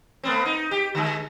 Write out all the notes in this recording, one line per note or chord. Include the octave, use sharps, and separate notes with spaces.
A3 B3 C4
D#4
G4
D3 G#3